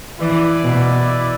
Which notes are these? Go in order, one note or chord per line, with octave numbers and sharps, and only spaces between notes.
E3 E4 B4 D5
B2